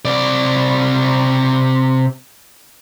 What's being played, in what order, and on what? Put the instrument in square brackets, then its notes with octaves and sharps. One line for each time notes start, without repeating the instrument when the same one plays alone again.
[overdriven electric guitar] C3 D5